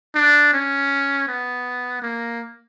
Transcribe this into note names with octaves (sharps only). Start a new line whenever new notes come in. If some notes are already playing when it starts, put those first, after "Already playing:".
D4
C#4
B3
A#3